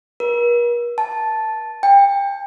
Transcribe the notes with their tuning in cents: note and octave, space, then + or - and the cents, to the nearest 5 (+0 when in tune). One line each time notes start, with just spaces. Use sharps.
A#4 +45
A5 -5
G5 +30